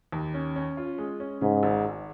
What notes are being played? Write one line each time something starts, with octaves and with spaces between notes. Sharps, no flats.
D#2
C#4
C#4
F4
G#3
C#4
G#2 C#3
G#1
G#1